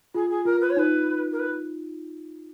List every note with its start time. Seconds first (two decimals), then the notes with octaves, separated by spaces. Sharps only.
0.14 F4 G#4
0.30 G#4
0.45 F4 A#4
0.61 B4
0.70 C#5
0.77 D#4 B4
1.32 A#4
1.39 B4